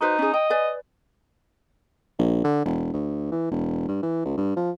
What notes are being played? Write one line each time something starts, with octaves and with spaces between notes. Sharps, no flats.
D#4 F#4 B4 C5
C#4 G#4
D#5 G5
B4 D5 G#5
A#1
D3
E1
D2
E3
E1
G2
E3
C#2
G2
F3